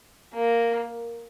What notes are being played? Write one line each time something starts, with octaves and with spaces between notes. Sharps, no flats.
A#3